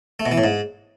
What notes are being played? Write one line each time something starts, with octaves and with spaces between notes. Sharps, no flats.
A3
B2
E3
A2
G#2